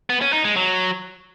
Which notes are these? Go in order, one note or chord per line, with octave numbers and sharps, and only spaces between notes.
B3
C#4
D#4
G#3
F#3